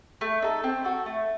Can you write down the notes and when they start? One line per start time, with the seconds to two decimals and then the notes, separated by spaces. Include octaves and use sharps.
0.21 A3
0.42 D#4 A4
0.64 C4
0.84 F#4 A4
1.06 A3